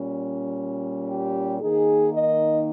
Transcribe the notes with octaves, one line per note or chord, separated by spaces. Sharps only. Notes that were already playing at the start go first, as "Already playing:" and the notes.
Already playing: A#2 G3 C#4
G4
D#3 A#3 D#4 G#4
D#5